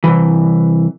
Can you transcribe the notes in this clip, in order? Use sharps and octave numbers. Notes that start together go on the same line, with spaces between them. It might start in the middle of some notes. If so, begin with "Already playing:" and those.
C2 F2 E3